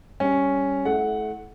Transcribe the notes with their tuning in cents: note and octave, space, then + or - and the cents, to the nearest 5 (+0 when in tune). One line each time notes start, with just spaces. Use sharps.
G3 +0 C#4 +0
A3 -30 E4 -10 F#5 +0